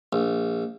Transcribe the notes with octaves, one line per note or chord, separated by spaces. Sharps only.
A#1